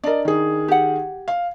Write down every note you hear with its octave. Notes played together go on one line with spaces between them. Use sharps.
D4 A#4 D5 D#5
D#3 G#4
G4 F#5
F5